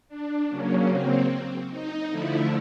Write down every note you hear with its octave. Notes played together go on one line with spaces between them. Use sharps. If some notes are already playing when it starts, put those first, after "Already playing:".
D4
C#3 F#3 A#3 C#4
C4
D#4
D3 F3 A3 E4